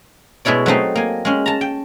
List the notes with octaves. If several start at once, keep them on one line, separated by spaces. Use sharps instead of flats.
B2 G#3 E4 C#5 D5
F#3 A3 C4 D#4
A#3 G#5
G#3 C#4
A5 A#5
G5